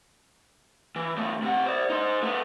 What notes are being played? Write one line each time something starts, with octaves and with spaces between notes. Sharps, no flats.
E3
E2 A3
C3 F#5
C5 D5
D#4 C5
A3 B3